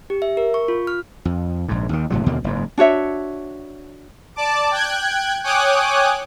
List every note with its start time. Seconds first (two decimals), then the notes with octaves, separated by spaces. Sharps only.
0.10 G4
0.22 E5
0.37 A#4
0.54 C#6
0.68 F4
0.87 F6
1.25 F2
1.68 A#1 G#2
1.89 D#2 D#3
2.10 F#1 A2 C3 F#3
2.26 D#2 B2 D3 A#3
2.44 F#1 G#2
2.78 D4 F#4 C#5 E5
4.36 D5 A5 D6
4.71 G5 F#6 G#6
5.44 C#5 G5 G#5 D6 D#6 F#6